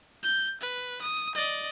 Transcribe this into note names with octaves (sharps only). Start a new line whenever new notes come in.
G6
B4
D#6
D5 D#5